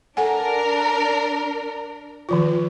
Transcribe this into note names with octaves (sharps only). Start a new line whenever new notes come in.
D4 A4 A#4 F#5 G#5
D#3 F3 F4